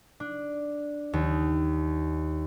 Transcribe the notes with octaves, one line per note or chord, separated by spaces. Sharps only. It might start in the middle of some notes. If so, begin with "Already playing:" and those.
D4
D#2